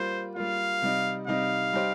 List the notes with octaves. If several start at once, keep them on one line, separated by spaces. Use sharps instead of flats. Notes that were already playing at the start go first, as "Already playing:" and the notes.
Already playing: G3 A#3 F4 C5
G3 A#3 F4 F5
C3 G3 D#4
C3 G3 D#4 F5
G3 D#4 G4 C5